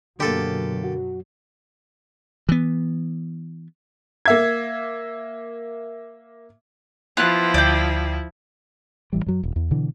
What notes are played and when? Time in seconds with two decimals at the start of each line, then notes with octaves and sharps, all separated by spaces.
0.20 F#2 B2 D3 F#3 A#3 G4 A4
0.84 F#4
2.49 E3 B3
4.26 A#3 E5 G#6
7.17 F3 B3 E4 F4 F#6
7.54 D2 D5 G5
9.13 A1 E3 G3
9.26 F#2 F#3
9.43 D#1
9.56 E2
9.71 B2 D3 E3